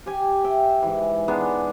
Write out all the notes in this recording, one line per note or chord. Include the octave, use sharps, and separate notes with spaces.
G4 G#5
E5 G5
G#2 E3
G#3 B3 D4 D#4